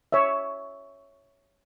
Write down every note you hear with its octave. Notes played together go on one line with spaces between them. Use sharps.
C#5 E5